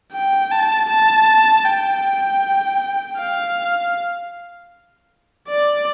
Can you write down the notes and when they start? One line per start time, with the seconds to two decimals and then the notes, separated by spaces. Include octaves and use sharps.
0.13 G5
0.51 A5
0.90 A5
1.65 G5
3.18 F5
5.48 D5